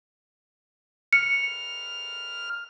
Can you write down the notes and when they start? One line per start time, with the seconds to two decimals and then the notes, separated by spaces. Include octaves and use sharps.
1.13 F6 C#7